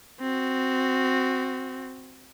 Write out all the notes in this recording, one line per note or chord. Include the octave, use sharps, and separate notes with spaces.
C4 F#4